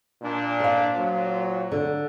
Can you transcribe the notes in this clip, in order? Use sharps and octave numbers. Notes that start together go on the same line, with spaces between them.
A#2 D4
C5 F5
A#2 F#3
D3